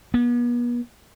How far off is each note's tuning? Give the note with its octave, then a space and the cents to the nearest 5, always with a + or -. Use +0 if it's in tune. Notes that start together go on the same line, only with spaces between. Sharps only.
B3 -40